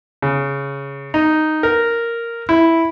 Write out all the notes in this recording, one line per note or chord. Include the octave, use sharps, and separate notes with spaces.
C#3
D#4
A#4
E4